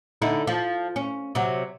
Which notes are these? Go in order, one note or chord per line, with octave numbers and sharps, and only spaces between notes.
D3 D#4 E4
F3
C#4
C3 F#3